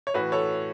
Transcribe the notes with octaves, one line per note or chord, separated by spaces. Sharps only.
C#5
A2 E3 F#4 B4
A4 C#5